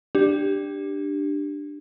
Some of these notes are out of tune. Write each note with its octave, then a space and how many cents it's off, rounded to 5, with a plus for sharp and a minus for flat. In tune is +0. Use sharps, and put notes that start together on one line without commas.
D4 +10 G4 +0